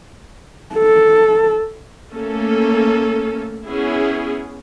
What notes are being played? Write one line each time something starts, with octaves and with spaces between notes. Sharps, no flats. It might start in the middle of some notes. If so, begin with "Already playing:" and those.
A4
A3 A#3 C#4 A4
B3 C#4 E4 G#4